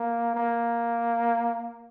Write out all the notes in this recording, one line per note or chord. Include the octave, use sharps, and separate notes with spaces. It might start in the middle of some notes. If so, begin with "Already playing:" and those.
Already playing: A#3
A#3